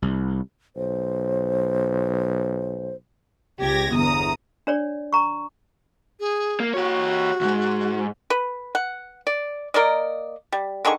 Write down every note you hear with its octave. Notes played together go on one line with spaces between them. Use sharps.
C2
B1 C5
C#2 G4 G#6 A#6
G1 E2 A#5 D#6
D4 C#5 D5
A#5 C#6
G#4
A#3
F#4 G4 C#5
D2 G#2
B4
F#5
D5
A#3 A#4 D5 D#5
G3
D3 D#3 G#4 C#6